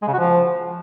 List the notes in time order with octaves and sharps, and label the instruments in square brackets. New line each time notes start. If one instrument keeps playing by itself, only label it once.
[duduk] G#3
C#3
F#4
F3